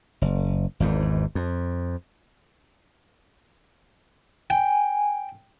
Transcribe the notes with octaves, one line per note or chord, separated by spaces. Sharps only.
F#1
G#1 E2 G#2
F2
G5 G#5